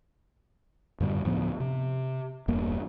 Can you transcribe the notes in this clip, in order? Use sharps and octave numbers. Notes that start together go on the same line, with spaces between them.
F#2 A2 D3 G3
D2 A2 F3 B3
C3
E1 E2 G2 A#3